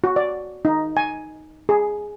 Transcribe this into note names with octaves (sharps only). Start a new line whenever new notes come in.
F#4
D5
D#4
G#5
G#4